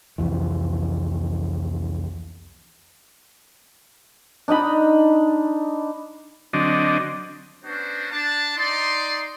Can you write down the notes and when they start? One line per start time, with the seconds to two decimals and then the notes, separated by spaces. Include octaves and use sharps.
0.18 C2 F2 E3
4.48 D4 D#4 D#5 B5
6.53 D3 F#3 C4 D4 D#5
7.65 B3 C#4 D4 F#4 B4 C5
8.11 D4 A5
8.56 D#4 D5 C6